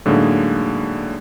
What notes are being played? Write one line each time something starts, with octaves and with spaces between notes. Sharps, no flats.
A2 D3 F#3 G#3 A#3 D#4